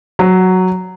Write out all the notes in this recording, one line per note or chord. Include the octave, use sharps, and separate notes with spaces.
F#3